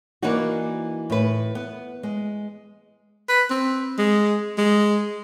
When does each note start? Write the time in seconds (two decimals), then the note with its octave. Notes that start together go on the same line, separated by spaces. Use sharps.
0.22 E3 A#3 D4 D#4 F#4
1.10 A2 B4
1.55 B3
2.03 G#3
3.29 B4
3.50 C4
3.98 G#3
4.58 G#3